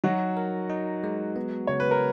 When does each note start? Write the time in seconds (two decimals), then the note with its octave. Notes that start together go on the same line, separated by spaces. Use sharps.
0.04 F#3 D#4 F#4
0.37 A#4
0.70 D#4
1.04 G#3
1.36 B3
1.67 C#3 C#5
1.80 B4
1.91 A#4